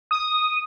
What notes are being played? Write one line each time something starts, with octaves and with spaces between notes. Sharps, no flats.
D#6